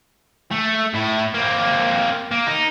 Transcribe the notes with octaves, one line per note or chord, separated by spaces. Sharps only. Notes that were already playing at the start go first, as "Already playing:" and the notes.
A3
A2 E4
A#3 C4
A#3
D#4